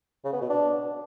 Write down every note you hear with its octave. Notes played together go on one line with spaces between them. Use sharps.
C#3
B3
B2
D4